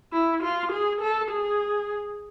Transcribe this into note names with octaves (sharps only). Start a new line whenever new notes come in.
E4
F4
G#4
A4
G#4